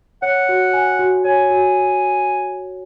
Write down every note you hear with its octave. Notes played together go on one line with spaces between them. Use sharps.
C#5 F#5
F#4
G#5
F#4
C#5 G#5
F#4